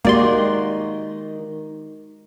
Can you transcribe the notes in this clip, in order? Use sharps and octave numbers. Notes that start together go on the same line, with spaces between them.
D#3 G#3 A#3 F#4 G4 D5 C6